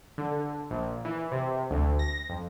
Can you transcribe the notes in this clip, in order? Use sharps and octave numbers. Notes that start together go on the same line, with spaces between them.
D3
A#1
E3
C3
D2
A#6
F2